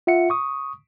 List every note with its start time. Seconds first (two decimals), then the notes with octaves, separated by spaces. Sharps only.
0.07 F4 E5 F#5 C#7
0.30 C#6 D#6